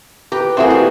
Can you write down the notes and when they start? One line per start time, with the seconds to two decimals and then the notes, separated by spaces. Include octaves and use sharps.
0.32 G4 B4 G5 A#5
0.57 E3 A3 A#3 C4 F#4 G#4
0.70 G3